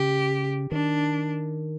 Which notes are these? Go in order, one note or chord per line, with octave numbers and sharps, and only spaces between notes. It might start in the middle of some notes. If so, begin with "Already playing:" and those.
Already playing: C#3 G4
D#3 D4